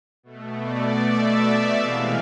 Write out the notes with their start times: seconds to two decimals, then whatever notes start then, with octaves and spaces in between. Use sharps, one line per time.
0.23 B2 A3
0.61 D5
1.01 E5
1.77 C3 E3 G#3 F5